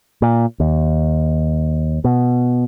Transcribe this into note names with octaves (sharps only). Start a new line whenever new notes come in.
A#2
D#2
B2